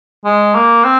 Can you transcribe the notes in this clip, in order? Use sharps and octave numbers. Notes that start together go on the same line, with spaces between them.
G#3
A#3
C4